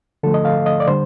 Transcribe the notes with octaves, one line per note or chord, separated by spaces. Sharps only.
D3 F3 A3 A4
D#5
F5
D#5
D5
D3 G3 C5